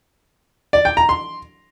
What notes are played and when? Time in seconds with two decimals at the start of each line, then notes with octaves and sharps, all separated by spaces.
0.73 D5
0.85 G5
0.97 A#5
1.09 C6